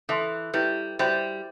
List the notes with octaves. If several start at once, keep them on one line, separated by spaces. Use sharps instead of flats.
E3 A4 E5 A5 C6
G3 E4 G4 B4 E5
G3 F#4 C5 E5 G5 B5